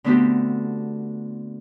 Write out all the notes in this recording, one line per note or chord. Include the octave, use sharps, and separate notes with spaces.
D3 A3 B3 C4 F#4 G4